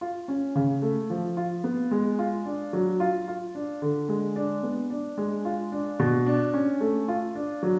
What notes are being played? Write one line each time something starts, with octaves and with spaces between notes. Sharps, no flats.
F4
C#4
C#3
A3
F3
F4
B3
G#3
F4
D4
F#3
F4
F4
D4
D3
G#3
D4
B3
D4
G#3
F4
D4
B2
D4
C#4
A3
F4
D4
F#3